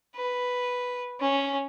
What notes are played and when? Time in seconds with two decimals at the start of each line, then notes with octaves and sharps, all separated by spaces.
0.16 B4
1.20 C#4